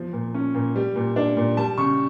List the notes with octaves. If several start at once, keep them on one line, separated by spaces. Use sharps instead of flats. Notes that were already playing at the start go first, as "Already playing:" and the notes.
Already playing: E2 F3
A#2
C#4
A#2
G3
A#2
D4
A#2
G3 A5
C#3 C#6